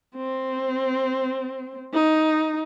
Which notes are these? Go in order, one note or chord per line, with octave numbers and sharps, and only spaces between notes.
C4
D#4